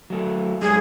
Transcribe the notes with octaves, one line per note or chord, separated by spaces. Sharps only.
F#3 A3
F#2 G3 G#3 G#4